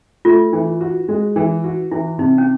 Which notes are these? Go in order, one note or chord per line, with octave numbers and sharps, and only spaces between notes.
A3 F4
E3
F#4
G#3
E3
F#4
E3 E4
C3 D#4
C#4